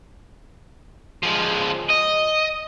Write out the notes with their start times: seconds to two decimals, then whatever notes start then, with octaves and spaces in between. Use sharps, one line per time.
1.23 F3 G#3
1.89 D#5